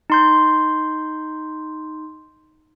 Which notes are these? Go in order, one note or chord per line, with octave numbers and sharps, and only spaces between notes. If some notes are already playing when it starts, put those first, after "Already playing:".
D#4 C6 G6